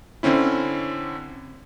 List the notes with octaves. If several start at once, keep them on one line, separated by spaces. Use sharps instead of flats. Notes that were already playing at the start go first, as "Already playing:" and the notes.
D3 C4 C#4 E4